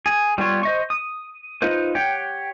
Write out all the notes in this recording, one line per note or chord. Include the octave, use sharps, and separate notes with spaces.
G#4
G3 B3 F4 C#5
C5 D#5 C#6
D#6
D#4 F4 B4 C5
G4 C#5 F#5 G5